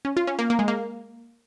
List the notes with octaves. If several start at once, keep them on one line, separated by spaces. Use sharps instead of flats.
C#4
F4
C#4
A#3
A#3
G#3
A#3